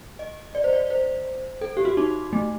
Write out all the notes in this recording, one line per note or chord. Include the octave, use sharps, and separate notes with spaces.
D#5
D5
C5
D5
C5
A4
G4
F#4
D#4
A3